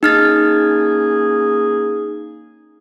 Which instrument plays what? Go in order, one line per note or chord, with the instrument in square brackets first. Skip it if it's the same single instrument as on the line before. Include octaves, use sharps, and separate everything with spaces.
[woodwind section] A#3 C#4 G#4 [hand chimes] D#4 F6 A6